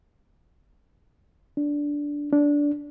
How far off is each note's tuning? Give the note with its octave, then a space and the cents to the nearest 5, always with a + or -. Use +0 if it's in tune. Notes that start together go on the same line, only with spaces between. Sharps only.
D4 -10
D4 -15